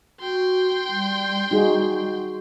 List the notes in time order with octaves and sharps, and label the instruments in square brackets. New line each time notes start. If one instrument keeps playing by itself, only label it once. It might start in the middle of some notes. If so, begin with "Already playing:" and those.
[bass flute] F#4 [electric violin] G5 C6
[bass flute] G3
[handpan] D#4 F#4 G#4